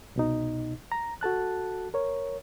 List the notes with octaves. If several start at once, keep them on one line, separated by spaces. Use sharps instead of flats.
C2 B2 D#4
A#5
F#4 A4 A5 F#6
A#4 C#5